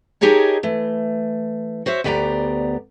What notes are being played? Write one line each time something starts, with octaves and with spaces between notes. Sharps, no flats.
D#4 G4 G#4 A#4 C#5 A5
E3 A3
F#4 C5 C#5 E5
D2 B3 G4 D5 G5 A#5